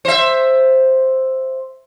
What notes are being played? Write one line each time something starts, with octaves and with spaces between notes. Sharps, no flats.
C5 E5